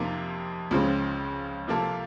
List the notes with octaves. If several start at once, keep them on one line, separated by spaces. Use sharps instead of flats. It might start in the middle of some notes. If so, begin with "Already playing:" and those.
Already playing: F2 C3 F3 A#3 D#4
C#2 C#3 F3 C4
C3 F3 A#3 F4 A4